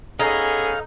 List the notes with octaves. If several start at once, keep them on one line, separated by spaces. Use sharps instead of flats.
B3 C#4 D#4 G#4 A4 F5